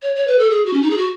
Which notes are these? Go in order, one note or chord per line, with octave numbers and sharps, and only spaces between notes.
C#5
C#5
B4
A4
G#4
F#4
C#4
D#4
G#4
F#4